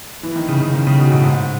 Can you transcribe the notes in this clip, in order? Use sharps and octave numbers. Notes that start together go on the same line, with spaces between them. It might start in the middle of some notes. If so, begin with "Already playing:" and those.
E3
D#3
C#3
D#3
C#3
D#3
C#3
B2
A2
G#2